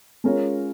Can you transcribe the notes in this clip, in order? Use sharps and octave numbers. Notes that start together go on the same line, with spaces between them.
G#3 C#4 F4 A#4 C#5